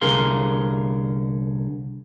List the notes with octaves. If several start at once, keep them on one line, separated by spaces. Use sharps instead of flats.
C2 D3 G#4 A#4 F5 C6